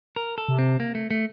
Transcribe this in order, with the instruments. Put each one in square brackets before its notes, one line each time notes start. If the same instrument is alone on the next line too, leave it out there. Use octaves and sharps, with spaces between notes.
[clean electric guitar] A#4
A4
[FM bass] C3
[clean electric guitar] C4
A#3
A3
A3